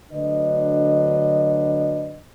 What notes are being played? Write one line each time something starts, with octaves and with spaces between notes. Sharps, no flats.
D2 D3 F#3 D4 B4 D#5